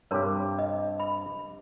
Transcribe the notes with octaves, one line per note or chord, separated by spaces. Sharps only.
G2 C3 G4 A#4 C#5
D#5
B5